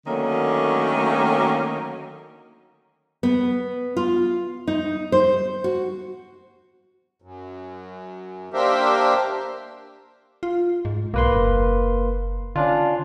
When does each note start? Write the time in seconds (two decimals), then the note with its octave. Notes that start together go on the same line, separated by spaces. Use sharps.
0.07 D3 D#3 F#3 A3 A#3 C#4
3.23 B3
3.97 F4
4.67 D#4
5.12 C5
5.64 F#4
7.22 F#2
8.54 A#3 D4 G4 A#4 C5 E5
10.43 F4
10.85 G#2
11.14 B1 A#3 B4 C6
11.33 F#1
12.56 D3 C#4 D4 F4